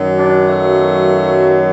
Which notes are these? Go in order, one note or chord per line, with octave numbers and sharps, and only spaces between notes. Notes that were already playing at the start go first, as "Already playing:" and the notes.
Already playing: F#2 D#3 F#3
D4
A3